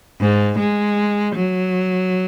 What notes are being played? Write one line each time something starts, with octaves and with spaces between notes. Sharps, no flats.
G#2
G#3
F#3